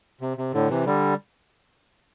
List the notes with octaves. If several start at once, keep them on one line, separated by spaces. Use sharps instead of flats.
C3
C3
A2 D3
C3 E3
D3 G3